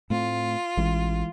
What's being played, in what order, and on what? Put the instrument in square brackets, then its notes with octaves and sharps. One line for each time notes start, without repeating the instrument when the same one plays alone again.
[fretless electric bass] A2 A3 C4 [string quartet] F4
[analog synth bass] A1 [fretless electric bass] E3 G#3